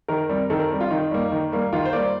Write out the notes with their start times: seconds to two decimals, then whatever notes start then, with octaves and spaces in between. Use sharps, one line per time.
0.08 D#3 A#4
0.29 G3 C4
0.50 D#3 A4
0.59 A#4
0.70 G3 C4
0.80 F4
0.90 D#3 D#4
1.11 G3 A#3
1.32 D#3
1.52 G3 A#3
1.73 D#3 F4
1.85 C5
1.92 G3 A#3 D5